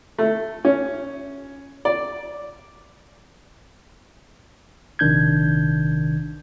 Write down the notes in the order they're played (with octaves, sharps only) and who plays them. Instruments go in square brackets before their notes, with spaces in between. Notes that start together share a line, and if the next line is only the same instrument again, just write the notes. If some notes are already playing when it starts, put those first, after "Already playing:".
[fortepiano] A3
C#4
D5
[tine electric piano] A#1 C3 D#3 D4 G6 G#6